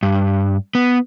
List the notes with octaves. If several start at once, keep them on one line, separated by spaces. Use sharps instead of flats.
G2
B3